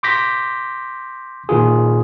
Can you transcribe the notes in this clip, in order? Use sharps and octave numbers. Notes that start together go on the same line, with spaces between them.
C6 D6 G6 A#6 B6
A#2 D#3 F4 G#4